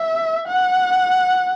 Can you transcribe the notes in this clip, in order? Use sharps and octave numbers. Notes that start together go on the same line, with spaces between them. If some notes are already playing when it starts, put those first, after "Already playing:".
Already playing: E5
F#5